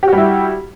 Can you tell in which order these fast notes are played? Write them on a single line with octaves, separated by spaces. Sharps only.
G4 F#4 G3 E4